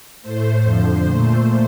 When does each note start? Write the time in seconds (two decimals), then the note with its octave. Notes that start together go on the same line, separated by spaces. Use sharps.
0.22 A2 A3 C5
0.63 F2 D3 F3
1.04 A#2 A3 C5